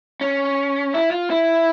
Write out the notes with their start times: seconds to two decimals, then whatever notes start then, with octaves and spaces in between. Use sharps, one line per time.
0.21 C#4
0.94 E4
1.11 F4
1.30 E4